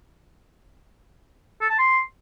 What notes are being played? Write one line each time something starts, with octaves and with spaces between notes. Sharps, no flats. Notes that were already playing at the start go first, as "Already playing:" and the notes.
A4
A5
C6